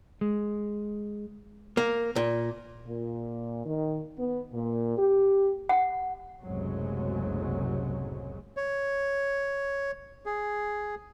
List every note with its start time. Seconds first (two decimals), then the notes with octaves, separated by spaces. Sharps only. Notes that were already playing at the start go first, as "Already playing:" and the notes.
0.21 G#3
1.77 A#3
2.16 A#2
2.86 A#2
3.66 D#3
4.17 B3
4.52 A#2
4.97 G4
5.69 F#5
6.41 F#1 C2 F#2 A2 F#3 G#3
8.57 C#5
10.26 G#4